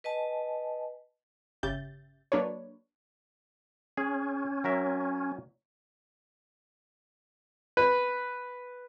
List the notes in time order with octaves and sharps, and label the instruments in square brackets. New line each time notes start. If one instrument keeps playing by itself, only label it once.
[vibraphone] B4 D#5 G#5 A5
[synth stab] G1 C#3 G4 E5 G6 A6
F#3 A#3 D4 A4 B4 C#5
[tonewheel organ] C#4 [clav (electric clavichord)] G#4
[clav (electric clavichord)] F#3 A#4 E5
[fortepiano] B4